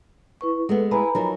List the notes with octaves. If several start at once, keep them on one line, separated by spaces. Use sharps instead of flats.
E4 B4 C#6
G#3 A3 B3 A4 B4
E4 G#4 B4 A#5 B5
F3 F#3 D#4 A#4